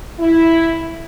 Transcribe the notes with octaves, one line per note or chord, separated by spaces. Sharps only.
E4